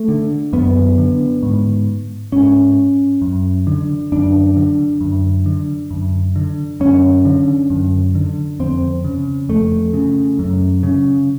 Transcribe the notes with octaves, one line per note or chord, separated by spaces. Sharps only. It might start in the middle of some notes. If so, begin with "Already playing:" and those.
Already playing: A3
D3
F#2 B3
D3
G#2
G#2 C#4
F#2
D3
F#2 D4
D3
F#2
D3
F#2
D3
F#2 C#4
D3
F#2
D3
F2 C4
C#3
F2 A3
C#3
F#2
C#3